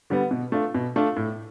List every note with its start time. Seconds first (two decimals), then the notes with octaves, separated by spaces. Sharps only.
0.10 D3 G3 B3
0.31 B2
0.52 A3 D4 F4
0.75 B2
0.96 A3 D4 F4
1.17 A2